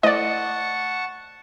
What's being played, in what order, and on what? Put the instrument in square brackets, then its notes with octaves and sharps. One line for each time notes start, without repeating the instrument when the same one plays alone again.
[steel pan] A3 E4 C5 [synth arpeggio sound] D5 D#5 [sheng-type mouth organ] F#5 A5 C#6